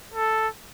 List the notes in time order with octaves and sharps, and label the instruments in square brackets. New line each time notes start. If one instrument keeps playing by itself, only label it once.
[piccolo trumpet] A4